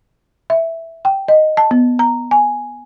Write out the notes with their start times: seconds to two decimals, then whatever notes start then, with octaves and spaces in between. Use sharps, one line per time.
0.50 E5
1.05 G5
1.28 D#5
1.57 A5
1.71 B3
1.99 A#5
2.31 G#5